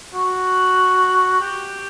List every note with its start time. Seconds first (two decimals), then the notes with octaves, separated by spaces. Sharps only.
0.13 F#4
1.41 G4